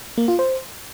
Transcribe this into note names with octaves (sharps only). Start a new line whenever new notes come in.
A#3
F4
C5